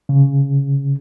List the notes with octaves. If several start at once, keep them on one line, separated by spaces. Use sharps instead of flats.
C#3